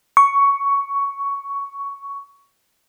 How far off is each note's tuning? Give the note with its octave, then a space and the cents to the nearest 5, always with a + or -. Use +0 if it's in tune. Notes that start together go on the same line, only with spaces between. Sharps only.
C#6 +10